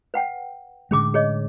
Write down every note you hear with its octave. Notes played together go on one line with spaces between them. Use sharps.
B4 F#5 G5
A2 D3 G#3 C#4 G#4 D6
G#4 C#5 D#5